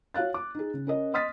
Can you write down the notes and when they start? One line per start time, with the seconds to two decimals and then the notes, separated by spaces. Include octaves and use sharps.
0.14 F#4 C#5 F5 F#6 A6
0.34 D6
0.55 D#4 G#4
0.74 C#3
0.87 C#4 A#4 D#5
1.14 D#5 C6 D#6 F6 A6 B6